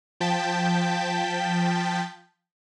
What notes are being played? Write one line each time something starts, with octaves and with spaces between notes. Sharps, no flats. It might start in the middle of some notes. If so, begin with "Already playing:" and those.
F3 G5 A5 G6 A6 B6